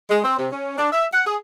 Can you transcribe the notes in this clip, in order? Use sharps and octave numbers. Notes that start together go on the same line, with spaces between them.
G#3
C4
C3
C#4
D4
E5
F#5
G#4